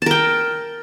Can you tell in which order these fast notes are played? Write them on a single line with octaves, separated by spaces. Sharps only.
A5 A#4 G5